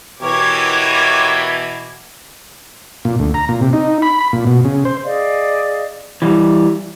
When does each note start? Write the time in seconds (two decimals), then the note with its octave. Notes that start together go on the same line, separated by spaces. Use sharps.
0.22 B2 E3 G4 A#4 C#5 D6 G#6
3.05 A#2
3.19 D2
3.34 A#5
3.49 A#2
3.61 C3
3.73 D#4
4.02 B5
4.21 B5
4.33 A#2
4.47 B2
4.65 C#3
4.85 C5
5.03 G#4 D5 D#5 F5
6.22 E3 G3